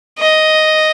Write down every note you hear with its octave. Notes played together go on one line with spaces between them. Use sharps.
D#5